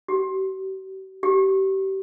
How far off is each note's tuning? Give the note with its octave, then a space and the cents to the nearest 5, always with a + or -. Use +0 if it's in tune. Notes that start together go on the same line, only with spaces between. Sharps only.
G4 -45
G4 -30